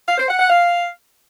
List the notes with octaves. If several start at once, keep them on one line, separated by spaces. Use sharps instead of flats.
F5
C5
F#5
F#5
F5